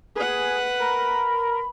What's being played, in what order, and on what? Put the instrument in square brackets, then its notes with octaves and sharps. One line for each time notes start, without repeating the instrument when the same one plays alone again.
[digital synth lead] G#4 [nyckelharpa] B4 F#5
[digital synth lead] A#4 [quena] B5